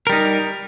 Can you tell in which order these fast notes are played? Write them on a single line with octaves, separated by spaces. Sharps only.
A#4 G3 D#4